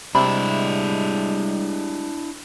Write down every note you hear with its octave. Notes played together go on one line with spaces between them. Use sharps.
C3 G3 G#3 D4 E4 B5